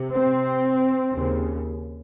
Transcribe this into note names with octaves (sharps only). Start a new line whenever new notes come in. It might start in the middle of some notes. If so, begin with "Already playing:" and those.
Already playing: C3
C4
D#2 C#3